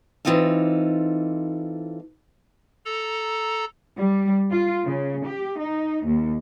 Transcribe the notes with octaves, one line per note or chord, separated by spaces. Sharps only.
E3 F3 C4 D#4 F4 A4
A4 A#5
G3
F4
C#3
G4
D#4
D#2